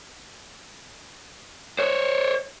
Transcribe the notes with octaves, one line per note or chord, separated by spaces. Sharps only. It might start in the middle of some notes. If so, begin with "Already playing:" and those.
C5 C#5